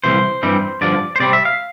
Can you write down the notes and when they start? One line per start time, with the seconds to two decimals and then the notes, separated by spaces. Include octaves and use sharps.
0.04 C2 C3 E3 C5
0.43 G2 E3 G3 C4
0.81 G2 D3 F3 D5
1.16 C5
1.20 C3 G3 C4 D5
1.33 E5
1.45 F5